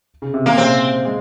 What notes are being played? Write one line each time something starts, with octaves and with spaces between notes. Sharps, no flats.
C#3
C3
A#2 A#3
C#3
C3 C4
G#3